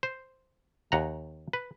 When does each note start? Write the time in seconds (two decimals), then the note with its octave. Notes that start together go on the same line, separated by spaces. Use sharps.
0.03 C5
0.92 D#2 F#5 A#5
1.53 B4